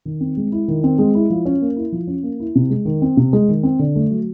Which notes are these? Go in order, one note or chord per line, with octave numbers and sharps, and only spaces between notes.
D#3
C4
G#3
E4
D#3
C4
G#3
E4
F3
C#4
A#3
E4
F3
C#4
A#3
E4
C3
G#3
D#3
C4
C3
G#3
D#3
C4
D3
A3
F#3